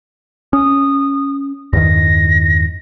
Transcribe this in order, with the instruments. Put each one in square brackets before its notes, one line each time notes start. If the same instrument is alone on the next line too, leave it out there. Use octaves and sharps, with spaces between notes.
[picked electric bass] C#4 [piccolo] D#6
[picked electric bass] E2 G2 D#3 [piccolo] A#6